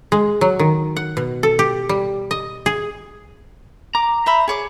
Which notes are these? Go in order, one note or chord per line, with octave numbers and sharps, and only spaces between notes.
G#3
F#3
D#3
F#5
B2
A4
G4
G3
D#5
G#4
A#5 D6
C5 E5 B5
G#4 C#5 D6